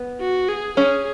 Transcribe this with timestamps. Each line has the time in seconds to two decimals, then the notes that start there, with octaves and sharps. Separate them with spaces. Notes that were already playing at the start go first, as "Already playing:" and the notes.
Already playing: B3
0.21 F#4
0.49 G#4
0.77 C#4 G#4